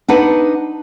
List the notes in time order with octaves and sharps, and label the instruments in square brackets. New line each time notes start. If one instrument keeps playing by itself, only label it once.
[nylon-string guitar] D4 D#4 B4 F#5